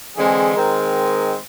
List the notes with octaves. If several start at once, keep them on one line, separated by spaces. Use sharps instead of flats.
D3 E3 G#3 C4 G#4
D#3 G#3 C4 A#4